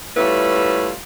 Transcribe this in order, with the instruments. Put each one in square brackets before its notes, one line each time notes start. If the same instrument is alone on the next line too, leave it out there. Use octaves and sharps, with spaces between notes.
[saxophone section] G3 A3 C#4 E4 F4 B4